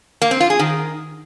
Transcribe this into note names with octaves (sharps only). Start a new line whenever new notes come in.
A#3
C4
F4
G#4
D#3